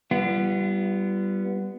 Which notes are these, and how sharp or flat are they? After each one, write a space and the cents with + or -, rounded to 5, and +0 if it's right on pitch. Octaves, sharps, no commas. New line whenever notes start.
G3 -10 B3 +0 F4 -45